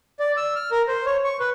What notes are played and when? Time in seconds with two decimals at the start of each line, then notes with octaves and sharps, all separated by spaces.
0.19 D5
0.37 E6
0.56 F6
0.71 A#4
0.88 C5
1.06 C#5
1.24 C#6
1.40 B4